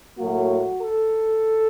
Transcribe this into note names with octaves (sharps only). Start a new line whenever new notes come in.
A2 F#3 A#3 F#4
A4